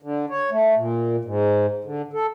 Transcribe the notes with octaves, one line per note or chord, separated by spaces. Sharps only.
D3
C#5
A3
A#2
G#2
D3
A4